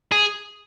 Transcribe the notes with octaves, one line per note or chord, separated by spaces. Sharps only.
G#4